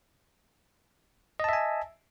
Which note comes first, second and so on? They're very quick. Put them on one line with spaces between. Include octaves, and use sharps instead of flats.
D#5 A5 E5 G#5